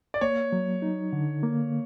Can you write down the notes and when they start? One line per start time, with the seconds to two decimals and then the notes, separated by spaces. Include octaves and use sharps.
0.14 D5
0.21 A#3 C#5
0.52 F#3
0.82 D#4
1.13 D3
1.43 A#3